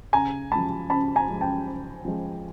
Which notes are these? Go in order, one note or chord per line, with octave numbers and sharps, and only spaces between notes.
C#3 G#5 A#5
F3 G#3 A5 B5
C#3 A5 B5
G#5 A#5
F3 G#3
G5 A5
C#3
F3 G#3